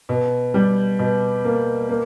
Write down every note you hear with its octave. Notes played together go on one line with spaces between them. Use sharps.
B2
G3
B2
A#3
A#3